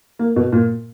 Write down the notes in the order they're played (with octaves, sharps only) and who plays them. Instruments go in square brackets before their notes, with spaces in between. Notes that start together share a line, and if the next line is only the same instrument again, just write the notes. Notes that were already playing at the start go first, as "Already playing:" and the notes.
[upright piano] A#3
B2
A#2